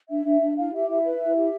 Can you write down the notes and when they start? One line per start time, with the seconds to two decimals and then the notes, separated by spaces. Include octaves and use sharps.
0.09 D4 E5
0.25 D4
0.41 D4
0.57 E4 F5
0.73 G4 E5
0.89 E4 E5
1.05 B4
1.21 E4
1.36 G4